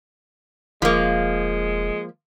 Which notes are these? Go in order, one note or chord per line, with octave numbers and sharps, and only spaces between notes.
E1 F3 G#3 A#3